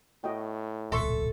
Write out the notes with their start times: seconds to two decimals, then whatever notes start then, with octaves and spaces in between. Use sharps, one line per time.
0.24 A2 F#4 D#5 G5
0.92 D1 B1 A#2 A4 E5 C6 C#6